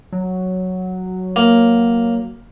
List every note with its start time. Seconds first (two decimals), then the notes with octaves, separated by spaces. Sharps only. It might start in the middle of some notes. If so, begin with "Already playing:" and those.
0.13 F#3
1.36 A#3